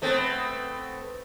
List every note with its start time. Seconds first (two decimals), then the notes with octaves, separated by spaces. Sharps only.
0.02 A3 B3 C4